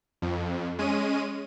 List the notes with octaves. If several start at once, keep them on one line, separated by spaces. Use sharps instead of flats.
F2
G#3 C#4 D#7